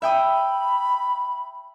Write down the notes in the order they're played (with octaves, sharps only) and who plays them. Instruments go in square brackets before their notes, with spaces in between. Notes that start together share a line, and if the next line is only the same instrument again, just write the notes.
[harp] E5 G5 D#6 [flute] B5